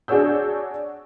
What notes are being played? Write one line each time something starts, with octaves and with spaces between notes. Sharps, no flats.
D4 F#4 G#4 C#5 E6 G6